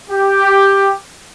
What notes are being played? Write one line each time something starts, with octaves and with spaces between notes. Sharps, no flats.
G4